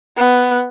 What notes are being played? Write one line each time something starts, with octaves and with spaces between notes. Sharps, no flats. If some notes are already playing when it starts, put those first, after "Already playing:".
B3